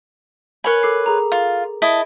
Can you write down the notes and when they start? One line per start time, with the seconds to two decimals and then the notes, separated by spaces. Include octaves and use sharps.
0.64 A#4 B4 C#5 G#5 B5
0.83 A4 D6 C7
1.06 G#4 A#5
1.32 F4
1.82 E4 D#5 A5